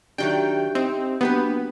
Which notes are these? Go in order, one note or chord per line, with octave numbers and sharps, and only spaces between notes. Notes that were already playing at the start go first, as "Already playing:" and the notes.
D#3 F#3 D4 G4 E5 G5
C4 D#4
F#3 A#3 B3 D4 G4 B4